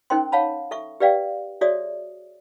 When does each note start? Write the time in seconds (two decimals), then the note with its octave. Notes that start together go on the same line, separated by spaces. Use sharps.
0.10 C#4 D#4 A#4 C5 G5 C6
0.32 C#5 F5 F#5 A5 B5
0.71 A4 E5 C#6
1.00 G4 B4 D5 F5 G5
1.61 F#4 G#4 C#5 D5 E5 D#6